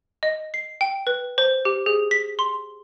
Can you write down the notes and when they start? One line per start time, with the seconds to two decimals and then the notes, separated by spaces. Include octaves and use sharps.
0.23 D#5
0.54 C7
0.81 G5
1.07 B4
1.38 C5
1.65 G4
1.86 G#4
2.11 B6
2.39 C6